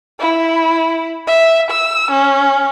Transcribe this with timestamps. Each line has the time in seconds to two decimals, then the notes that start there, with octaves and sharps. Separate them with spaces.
0.20 E4
1.27 E5
1.71 E6
2.11 C#4